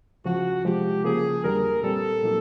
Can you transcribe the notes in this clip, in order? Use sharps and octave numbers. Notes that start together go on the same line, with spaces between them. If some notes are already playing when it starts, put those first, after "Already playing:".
C#2 C#3 F3 F#4
C3 F3 G#3 G4
C#3 F3 A#3 G#4
F2 D3 G3 A#4
A#2 G3 C4 A4
A#2 F#3 A#3 D#4